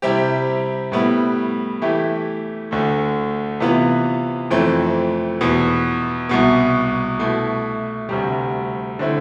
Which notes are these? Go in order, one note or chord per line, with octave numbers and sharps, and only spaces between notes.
C3 G3 C4 E4 G4
A2 G3 B3 E4
E3 A3 E4 G4
D2 D3 A3
C3 E3 B3 F4
F2 E3 A3 C4
E2 B2 B3
C2 B2 B3
B2 A3 E4
D2 C3 G3
D3 A3 C4 E4